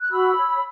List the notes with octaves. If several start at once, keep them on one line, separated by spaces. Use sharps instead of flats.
F#6
F#4 B5 E6
C#5